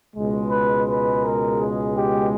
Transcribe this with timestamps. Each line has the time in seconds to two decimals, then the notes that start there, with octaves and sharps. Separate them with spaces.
0.15 C#2 B2 G#3
0.50 B4
0.87 B4
1.23 A#4
1.59 G#4
1.95 G4